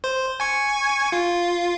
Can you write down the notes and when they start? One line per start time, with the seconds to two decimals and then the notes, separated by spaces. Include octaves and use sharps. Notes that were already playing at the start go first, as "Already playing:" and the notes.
0.04 C5
0.40 G#5 C#6
1.12 F4